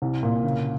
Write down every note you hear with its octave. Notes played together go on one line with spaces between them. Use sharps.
C2
A#2
C#3